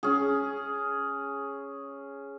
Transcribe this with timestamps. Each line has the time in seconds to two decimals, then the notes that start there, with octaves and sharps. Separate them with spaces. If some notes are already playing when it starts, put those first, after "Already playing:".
0.03 C#4 G#4